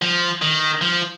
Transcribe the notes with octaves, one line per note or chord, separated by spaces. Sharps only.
F3
D#3
F3